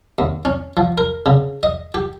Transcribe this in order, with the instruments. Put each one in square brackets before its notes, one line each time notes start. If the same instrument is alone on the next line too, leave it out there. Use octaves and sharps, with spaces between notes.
[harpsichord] D#2
C#4
F3
A#4
C#3
D#5
G4